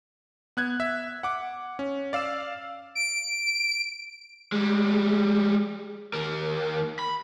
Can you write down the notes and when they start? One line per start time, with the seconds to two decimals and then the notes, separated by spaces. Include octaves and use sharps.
0.57 B3 F#6 G#6
0.80 E5
1.23 F#5 D6
1.79 C#4
2.13 D5 F5 E6 E7
2.95 D7
4.52 G3 G#3
6.13 D#2 A#4
6.99 B5